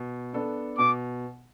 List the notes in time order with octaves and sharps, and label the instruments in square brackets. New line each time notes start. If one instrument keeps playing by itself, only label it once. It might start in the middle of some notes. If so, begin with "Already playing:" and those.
Already playing: [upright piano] B2
B3 D4 A4
[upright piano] B2 [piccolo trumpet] D6